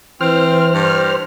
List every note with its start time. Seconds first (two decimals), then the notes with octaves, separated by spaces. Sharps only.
0.21 E3 C4 C5 F6
0.73 G2